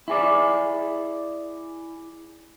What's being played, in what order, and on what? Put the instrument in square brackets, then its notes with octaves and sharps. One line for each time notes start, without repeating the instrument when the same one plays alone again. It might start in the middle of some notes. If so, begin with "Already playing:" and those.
[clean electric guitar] E4 G#4 D5